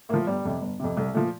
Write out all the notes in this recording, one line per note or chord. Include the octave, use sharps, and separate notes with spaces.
A2 F3 A#3
G1 G3
F2 C3
G1
F2 C3
C2 A3
A#2 F3 A3